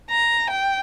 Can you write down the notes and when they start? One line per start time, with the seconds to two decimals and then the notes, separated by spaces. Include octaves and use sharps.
0.10 A#5
0.50 G5